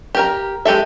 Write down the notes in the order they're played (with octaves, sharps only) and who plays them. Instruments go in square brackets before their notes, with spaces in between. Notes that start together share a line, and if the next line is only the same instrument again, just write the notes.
[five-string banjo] G4 A#4 A#5
G#3 G4 A4 E5